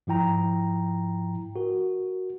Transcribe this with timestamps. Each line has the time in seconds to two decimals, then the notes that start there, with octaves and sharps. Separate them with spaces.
0.07 G#2 F3 E4 G5 A#5
1.56 F#4 A#4